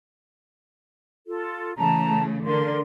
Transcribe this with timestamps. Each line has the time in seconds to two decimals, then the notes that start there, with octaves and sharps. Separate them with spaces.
1.27 F4 A4
1.77 C#3 E3 A3 A5 A#5
2.44 D3 A#4 C6